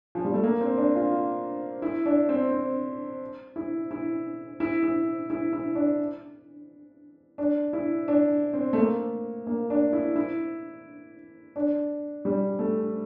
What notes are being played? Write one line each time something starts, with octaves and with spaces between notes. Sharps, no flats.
F3
G3
A3
A#3
C4
D4
F4
E4
D4
C4
C4
E4
E4
E4
E4
E4
E4
D4
D4
E4
D4
C4
A3
A#3
A#3
D4
E4
E4
D4
G3
A3